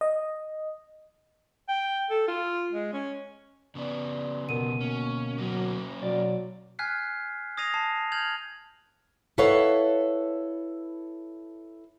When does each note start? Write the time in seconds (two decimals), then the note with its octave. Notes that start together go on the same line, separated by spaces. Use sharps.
0.01 D#5
1.69 G5
2.10 A4
2.28 F4
2.72 G#3
2.93 C#4
3.75 C#3 B3 D5
4.49 D2 B2 A#4 D#7
4.81 A#3 C#4
5.38 F#3 A#3 C#4
6.02 B1 F#3 D5
6.79 G#5 F6 F#6 G#6 B6 C7
7.57 D#6 G#6 A#6 C7 D#7 F7
7.74 A5 C7
8.12 F6 G6 G#6 F7 F#7
9.38 E4 A4 B4 C#5 F5 F#5